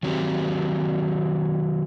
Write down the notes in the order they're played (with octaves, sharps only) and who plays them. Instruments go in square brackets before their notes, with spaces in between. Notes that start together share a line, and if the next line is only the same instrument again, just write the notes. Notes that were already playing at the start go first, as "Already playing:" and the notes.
[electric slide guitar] D#3 F#3 C4 G4